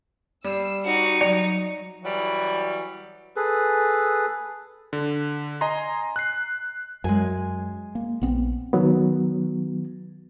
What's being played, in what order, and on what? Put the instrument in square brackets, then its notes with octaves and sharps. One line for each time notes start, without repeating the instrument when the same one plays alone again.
[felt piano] G3 [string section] E6 C7
[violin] D#4 C#7 [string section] F#4 D5
[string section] F#3 [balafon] D5
[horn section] E3 F#3 G3
[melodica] G#4 A4 B4
[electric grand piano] D3
D#5 G#5 A#5 C6
F#6 C7
[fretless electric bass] F#2 [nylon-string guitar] G#3 G#5
[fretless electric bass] A#3
A#1 B3 C4
[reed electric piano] D#3 F#3 B3